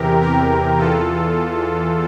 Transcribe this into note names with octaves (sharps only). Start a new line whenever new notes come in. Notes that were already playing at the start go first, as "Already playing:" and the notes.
Already playing: E2 C3 E3 G4 A#4
G4 A#4
E2 E3 F4 A4